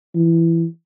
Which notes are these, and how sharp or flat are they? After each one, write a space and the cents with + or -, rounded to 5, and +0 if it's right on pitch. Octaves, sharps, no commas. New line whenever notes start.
E3 +15